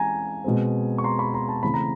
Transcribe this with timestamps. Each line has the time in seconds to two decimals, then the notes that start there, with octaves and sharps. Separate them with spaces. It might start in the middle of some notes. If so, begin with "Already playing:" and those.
Already playing: E3 G#3 C#4 G#5 A#5
0.44 B2 G#3 C4
0.98 C#6
1.04 A#5 C6
1.19 B5 C#6
1.34 A#5 C6
1.48 A5 B5
1.63 C#3 E3 A3 C4 B5
1.74 A#5